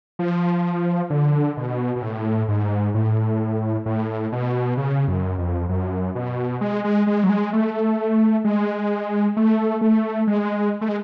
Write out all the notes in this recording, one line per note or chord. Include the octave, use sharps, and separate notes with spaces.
F3
D3
B2
B2
A2
G#2
A2
A2
B2
C#3
F#2
F2
F#2
B2
G#3
G#3
G#3
F#3
G#3
A3
G#3
A3
A3
G#3
A3
G#3